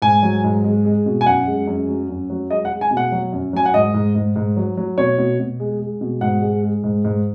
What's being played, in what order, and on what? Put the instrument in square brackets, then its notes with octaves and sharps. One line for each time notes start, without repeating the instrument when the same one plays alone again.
[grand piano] G#2 G#5
F#3
G#2
G#3
G#3
B2
G#5
F#2 F#5
G#3
F#2
F#3
F#2
F#3
G#3 D#5
F#5
G#3
G#5
B2
F#5
F#3
F#2
F#3 G#5
F#5
G#2 D#5
G#2
G#2
G#2
F#3
F#3
B2 C#5
B2
B2
G#3
G#3
B2
G#2 F#5
G#3
G#3
G#2
G#2